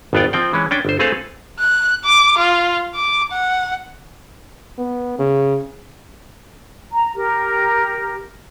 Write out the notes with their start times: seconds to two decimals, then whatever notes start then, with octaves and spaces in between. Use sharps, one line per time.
0.13 G#1 F2 B3 F4 D5 G5
0.33 F3 C4 G5
0.53 E3 G#3 C#4
0.71 C#4 D4 G5
0.85 G1 C5
0.99 A3 C4 G#4 A4 B4 F5
1.60 F#6
2.05 D6
2.38 F4
2.95 D6
3.32 F#5
4.78 B3
5.18 C#3
6.92 A#5
7.14 G4 A#4